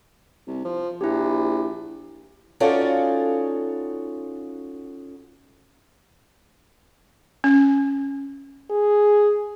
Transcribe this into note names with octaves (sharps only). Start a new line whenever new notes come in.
C2
F3
A#1 E4 G4
C#4 D#4 F4 F#4 A4 D5
C#4
G#4